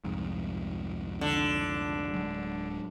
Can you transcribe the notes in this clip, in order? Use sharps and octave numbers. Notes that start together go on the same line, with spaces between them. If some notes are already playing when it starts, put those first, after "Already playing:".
C2 F2 G#2
D3
D1 F#3 G#3